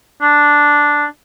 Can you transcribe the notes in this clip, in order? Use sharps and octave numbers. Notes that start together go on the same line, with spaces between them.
D4